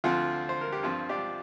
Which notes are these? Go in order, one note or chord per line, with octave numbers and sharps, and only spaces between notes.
D2 D3 F3 C4 F4
C5
A#4
G4
G2 F3 C4 F4
D4 G4